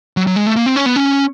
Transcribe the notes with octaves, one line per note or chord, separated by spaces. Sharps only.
F#3
F#3
G#3
A3
A#3
C4
C#4
B3
C#4